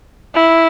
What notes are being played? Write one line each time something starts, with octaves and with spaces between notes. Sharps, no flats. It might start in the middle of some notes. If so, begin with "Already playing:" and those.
E4